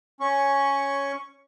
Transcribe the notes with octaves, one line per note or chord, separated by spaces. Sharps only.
C#4 C#6